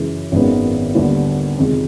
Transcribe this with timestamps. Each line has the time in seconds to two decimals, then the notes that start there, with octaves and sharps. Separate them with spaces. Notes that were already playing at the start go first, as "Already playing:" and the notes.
Already playing: F#2 C#3 E3 G#3
0.32 G#1 F#2 D#3 G#3 B3
0.95 D#2 D3 G3 B3 E4
1.59 F2 C3 D#3 G#3